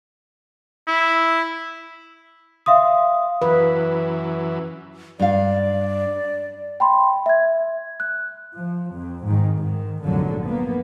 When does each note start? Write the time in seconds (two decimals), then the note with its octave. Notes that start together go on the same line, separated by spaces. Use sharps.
0.88 E4
2.66 E5 F5 C6 D#6
3.42 F#2 E3 B4
5.19 G2 D5 F5
6.80 G5 B5 C6
7.26 E5 G#6
8.00 F#6
8.57 F3
8.93 F2
9.25 G#2 D#3
9.57 G#2 D#3
10.05 F1 A#1 G#2 D3 F#3
10.45 A#3 B3